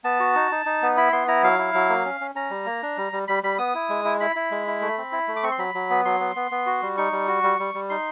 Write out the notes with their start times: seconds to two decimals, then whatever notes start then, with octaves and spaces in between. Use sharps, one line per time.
0.04 B3 A5
0.20 F#4
0.35 D#4
0.52 D#4
0.66 D#4
0.82 B3
0.97 E4 B5
1.12 B3 C6
1.28 E4 A#5
1.43 F#3 F5
1.59 E4
1.74 F#3
1.90 A#3
2.05 C#4
2.21 C#4
2.35 C#4 A#5
2.50 G3
2.66 A#3
2.82 D4
2.98 G3
3.12 G3
3.28 G3 B5
3.43 G3 B5
3.58 B3 D#6
3.75 E4
3.89 G#3
4.05 E4
4.20 E4 B5
4.36 E4
4.51 G#3
4.67 E4
4.81 A3
4.98 C4
5.12 E4
5.28 A3
5.36 D6
5.43 C4 C#6
5.52 C6
5.59 F#3 B5
5.74 F#3
5.90 B3
6.05 F#3 C6
6.20 B3
6.36 B3
6.51 B3
6.66 F#4
6.82 G3
6.97 D#4 C#6
7.12 G3
7.28 F#4
7.43 G3
7.59 G3
7.74 G3
7.90 D#4 C6